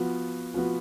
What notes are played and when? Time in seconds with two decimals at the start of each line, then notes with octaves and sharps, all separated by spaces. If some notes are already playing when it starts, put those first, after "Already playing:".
Already playing: F3 B3 F#4
0.54 F3 B3 F#4